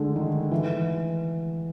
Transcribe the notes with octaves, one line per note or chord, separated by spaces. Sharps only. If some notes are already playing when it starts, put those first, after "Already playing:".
Already playing: D3 G#3 A3
D#3
E3